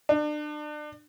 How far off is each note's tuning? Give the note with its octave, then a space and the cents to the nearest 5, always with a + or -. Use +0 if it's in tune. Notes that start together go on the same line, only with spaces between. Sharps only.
D4 +35